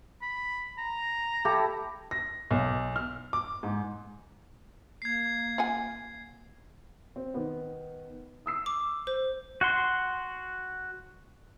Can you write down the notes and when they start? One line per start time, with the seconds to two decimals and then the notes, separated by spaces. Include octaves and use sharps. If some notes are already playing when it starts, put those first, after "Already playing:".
0.22 B5
0.78 A#5
1.45 E4 G4 A4
2.11 A#6
2.51 B1
2.96 F6
3.33 D6
3.63 G#2
5.02 A#3 G#6 C7
5.58 F4 F#5 G#5
7.16 C4
7.34 D#3 B3
8.46 D#6 E6 C7
8.66 D6
9.07 C5
9.61 F#4 F#5 C6